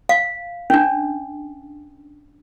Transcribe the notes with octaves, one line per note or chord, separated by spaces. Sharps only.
F5
C#4 D4